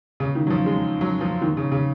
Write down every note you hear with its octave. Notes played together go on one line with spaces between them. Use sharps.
C#3
D#3
F#3
F3
G#3
F#3
F3
D#3
C#3
C#3